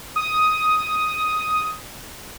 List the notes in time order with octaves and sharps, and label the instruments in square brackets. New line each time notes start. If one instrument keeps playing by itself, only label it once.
[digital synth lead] D#6